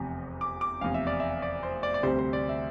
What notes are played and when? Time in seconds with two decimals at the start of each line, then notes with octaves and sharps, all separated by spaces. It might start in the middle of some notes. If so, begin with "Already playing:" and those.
Already playing: F1 E2 C3
0.41 D6
0.61 D6
0.81 F1 E2 C3 F5
0.94 E5
1.07 D5
1.20 E5
1.42 D5
1.63 C5
1.83 D5
1.94 D5
2.03 D2 C3 G3 C5
2.19 C5
2.33 D5
2.49 E5